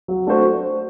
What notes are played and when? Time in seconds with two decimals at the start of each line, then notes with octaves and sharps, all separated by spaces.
0.08 F#3
0.27 A3 D4 F#4 C5